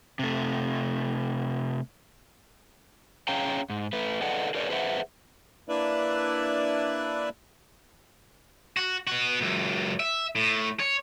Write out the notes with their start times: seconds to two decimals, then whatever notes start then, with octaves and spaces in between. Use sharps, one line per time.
0.19 C3 A3
3.28 C#4 G#4 C#5 F5 G5 A#5
3.70 G#2
3.93 A3 B4
4.22 G#4 A4 B4 D5 D#5 F#5
4.55 G#4 A#4 B4 C#5 D5
4.70 G#4 B4 C5 D#5 E5 F#5
5.69 A#3 D4 E4 B4 D5 E5
8.77 F#4
9.07 B3 F#4
9.41 C#2 F#2
10.00 E5
10.35 A2
10.79 C#5